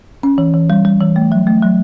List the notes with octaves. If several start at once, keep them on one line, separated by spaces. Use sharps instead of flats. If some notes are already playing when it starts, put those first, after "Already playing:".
C#4
E3
E3
G3
G3
E3
A3
F#3
A3
F#3